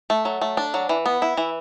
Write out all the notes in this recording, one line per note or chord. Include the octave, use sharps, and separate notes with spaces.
A3
F#3
A3
D4
F#3
E3
B3
E4
E3